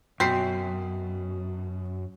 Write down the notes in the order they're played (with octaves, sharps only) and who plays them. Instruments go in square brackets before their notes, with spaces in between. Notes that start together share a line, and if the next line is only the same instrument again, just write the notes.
[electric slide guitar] F#2 [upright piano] B2 B6 C7 [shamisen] C4